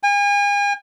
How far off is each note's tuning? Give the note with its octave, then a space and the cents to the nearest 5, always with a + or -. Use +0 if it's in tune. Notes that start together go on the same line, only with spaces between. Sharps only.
G#5 -40